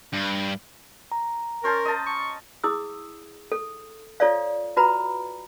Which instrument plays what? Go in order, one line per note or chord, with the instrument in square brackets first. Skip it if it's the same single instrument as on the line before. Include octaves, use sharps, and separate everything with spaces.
[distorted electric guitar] G2
[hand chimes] A#5
[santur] C#4 C5 A5 [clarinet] A#4
[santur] D#5 A5
[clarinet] C#6
[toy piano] E4 G#4 D#6 E6
A4
F4 A4 C#5 D5 F5
F4 F#4 B4 A#5 B5